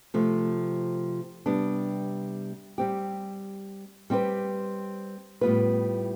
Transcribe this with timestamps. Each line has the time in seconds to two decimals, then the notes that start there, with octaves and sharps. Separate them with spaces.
0.14 C3 F3 A3
1.46 C3 G3 B3 D4
2.78 G3 C4 G4
4.10 G3 C4 G4 B4
5.41 A2 G3 B3 F4 B4